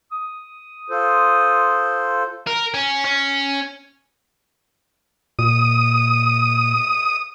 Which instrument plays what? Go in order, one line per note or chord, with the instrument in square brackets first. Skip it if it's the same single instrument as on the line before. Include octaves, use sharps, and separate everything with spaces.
[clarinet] D#6
[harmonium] F4 A4 C5
[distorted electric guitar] A#4
C#4
C#4
[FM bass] A#2 [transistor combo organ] D#6